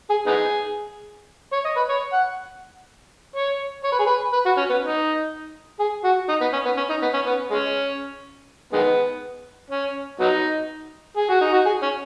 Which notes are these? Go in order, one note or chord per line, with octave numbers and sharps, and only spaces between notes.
G#4
B3 D#4 G#4
C#5
D#5
B4
C#5
F#5
C#5
C#5
B4
G#4
B4
B4
F#4
C#4
B3
D#4
G#4
F#4
D#4
B3
C#4
B3
C#4
D#4
B3
C#4
B3
G#3 C#4
D#3 G#3 B3
C#4
F#3 B3 D#4
G#4
F#4
D#4
F#4
G#4
C#4